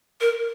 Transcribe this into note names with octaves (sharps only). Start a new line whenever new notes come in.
A#4